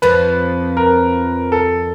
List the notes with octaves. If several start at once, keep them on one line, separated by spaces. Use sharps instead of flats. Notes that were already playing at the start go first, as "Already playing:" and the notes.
F2 F3 B4
A#4
A4